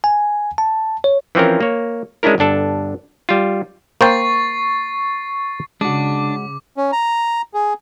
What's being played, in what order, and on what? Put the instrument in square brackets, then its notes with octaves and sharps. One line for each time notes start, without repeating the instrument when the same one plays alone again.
[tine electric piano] G#5
A5
C#5
[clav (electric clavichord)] E3 F3 C4 C#4 A#4
A#3 C#5
G#3 C#4 D4 E4 A#4
G1 G2 D4 A4
G3 F4
[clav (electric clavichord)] A#3 C5 G5 [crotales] C#6 A6 C7
[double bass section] C#3 [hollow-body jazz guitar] G#3 F#4 [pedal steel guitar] D4 [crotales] D6
[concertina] C#4
A#5
G#4